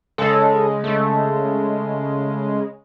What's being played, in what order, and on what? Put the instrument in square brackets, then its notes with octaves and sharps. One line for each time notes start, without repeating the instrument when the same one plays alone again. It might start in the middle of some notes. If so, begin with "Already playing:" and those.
[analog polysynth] C#3 G#3 [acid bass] A4
[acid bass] A3